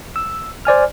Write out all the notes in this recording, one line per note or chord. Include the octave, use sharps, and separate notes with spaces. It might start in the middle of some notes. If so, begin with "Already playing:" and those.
E6
C5 D5 G#5 F6